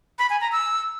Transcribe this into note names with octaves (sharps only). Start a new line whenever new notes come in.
B5
G#5
A#5
E6